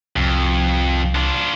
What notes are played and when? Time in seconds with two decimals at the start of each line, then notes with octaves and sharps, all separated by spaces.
0.16 C2 F2
1.15 D4 F4